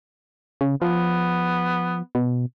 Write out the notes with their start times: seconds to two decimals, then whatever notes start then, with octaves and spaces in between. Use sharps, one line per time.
0.61 C#3
0.82 F3 B3
2.15 B2